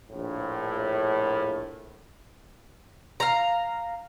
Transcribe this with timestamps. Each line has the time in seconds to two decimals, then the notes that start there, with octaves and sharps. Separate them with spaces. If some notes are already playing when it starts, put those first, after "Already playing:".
0.12 A#1 A2
3.20 F5 A#5